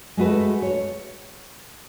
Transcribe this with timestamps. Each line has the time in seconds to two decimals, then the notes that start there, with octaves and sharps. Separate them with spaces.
0.17 G#3 A3 F#4 B4
0.62 C#5